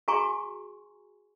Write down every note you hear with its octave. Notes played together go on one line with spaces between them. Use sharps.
F#4 G#4 G#5 A#5 C6 C#6